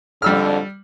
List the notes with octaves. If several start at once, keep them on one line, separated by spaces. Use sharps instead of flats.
F2 G#2 D3 G3 E6 F6